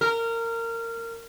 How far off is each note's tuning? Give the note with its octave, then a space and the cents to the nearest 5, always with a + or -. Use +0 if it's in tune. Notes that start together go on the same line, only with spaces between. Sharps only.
A#4 -20